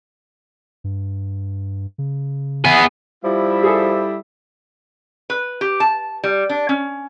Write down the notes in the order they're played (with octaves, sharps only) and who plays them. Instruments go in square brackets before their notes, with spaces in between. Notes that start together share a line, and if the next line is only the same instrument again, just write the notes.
[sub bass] G2
C#3
[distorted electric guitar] B3 G#4
[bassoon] F3 [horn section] G3 E4 E5
[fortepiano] G#4 A4
[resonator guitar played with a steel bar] B4
G4
A5
G3
D4
C#4